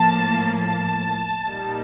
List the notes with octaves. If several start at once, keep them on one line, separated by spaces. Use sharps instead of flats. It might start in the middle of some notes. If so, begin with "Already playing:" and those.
Already playing: A2 F3 A#3 A5
A5
A#2 G3 A#3 D#4